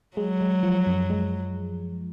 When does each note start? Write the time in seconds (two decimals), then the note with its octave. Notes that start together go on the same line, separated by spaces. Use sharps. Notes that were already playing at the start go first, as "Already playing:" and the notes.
0.17 F#3 G#3
0.41 G#3
0.63 F3
0.86 F#2
1.10 G#3